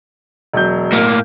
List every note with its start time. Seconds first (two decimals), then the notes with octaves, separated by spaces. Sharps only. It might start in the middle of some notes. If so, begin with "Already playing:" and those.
0.54 E1 F#3 G6
0.92 A2 A#3